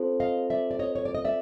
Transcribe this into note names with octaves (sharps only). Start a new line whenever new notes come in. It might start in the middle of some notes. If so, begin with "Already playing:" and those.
Already playing: C4 F4 A4 C5
D#5 F5
D5 E5
D5
C#5 D#5
C#5
D5
D#5
D5 E5